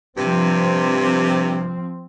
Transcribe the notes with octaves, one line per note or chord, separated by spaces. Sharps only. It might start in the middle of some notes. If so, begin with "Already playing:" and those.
G2 C3 F3 C4